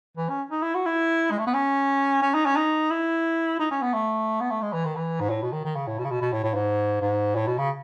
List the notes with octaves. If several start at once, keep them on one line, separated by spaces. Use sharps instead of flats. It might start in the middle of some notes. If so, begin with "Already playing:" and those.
E3
C#4
D#4
E4
F#4
E4
G#3
A3
B3
C#4
C#4
D#4
C#4
D#4
E4
D#4
C#4
B3
A3
B3
A3
G#3
E3
D#3
E3
G#2
A2
B2
D#3
D#3
C#3
A2
B2
C#3
B2
B2
A2
A2
G#2
G#2
A2
B2
C#3